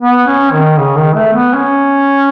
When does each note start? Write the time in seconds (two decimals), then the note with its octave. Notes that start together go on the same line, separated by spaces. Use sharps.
0.01 B3
0.26 C#4
0.52 D#3
0.78 C#3
0.96 D#3
1.15 A3
1.34 B3
1.54 C#4